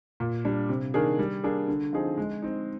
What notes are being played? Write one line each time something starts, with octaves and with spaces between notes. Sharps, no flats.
A#2
G3 D4
C3
D#3 A#3 D4 G#4
G3
A#3 D4 G#4
D3
F3 C4 D#4 G#4
G#3
C4 D#4